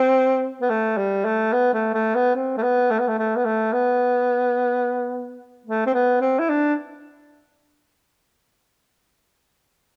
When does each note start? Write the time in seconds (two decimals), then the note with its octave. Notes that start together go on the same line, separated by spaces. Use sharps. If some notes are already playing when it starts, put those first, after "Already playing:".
Already playing: C4
0.61 B3
0.70 A3
0.97 G3
1.25 A3
1.52 B3
1.73 A3
1.94 A3
2.15 B3
2.35 C4
2.57 A3
2.63 B3
2.91 A3
2.99 B3
3.08 A3
3.18 A3
3.36 B3
3.45 A3
3.73 B3
5.66 A3
5.86 C4
5.94 B3
6.21 C4
6.39 E4
6.49 D4